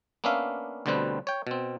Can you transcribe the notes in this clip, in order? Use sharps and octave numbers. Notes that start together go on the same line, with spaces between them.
A#3 B3 C#4 D4 E5 F5
D2 B2 D3 G3 C4 B4
C#5 G5
B2 C4